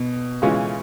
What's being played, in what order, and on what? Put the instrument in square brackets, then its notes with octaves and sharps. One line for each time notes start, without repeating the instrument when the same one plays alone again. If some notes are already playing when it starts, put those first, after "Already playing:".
Already playing: [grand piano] B2
[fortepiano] C#3 E3 G#3 C#4 F4